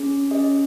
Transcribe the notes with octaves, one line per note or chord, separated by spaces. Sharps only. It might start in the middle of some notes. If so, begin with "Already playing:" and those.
Already playing: C#4 G#4
C#4 G#4 D#5